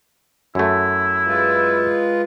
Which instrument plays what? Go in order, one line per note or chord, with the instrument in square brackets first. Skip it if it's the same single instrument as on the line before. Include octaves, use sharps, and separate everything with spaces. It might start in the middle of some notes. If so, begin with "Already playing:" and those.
[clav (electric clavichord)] F#2 A3 [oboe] E4
[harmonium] G#3 F4 B4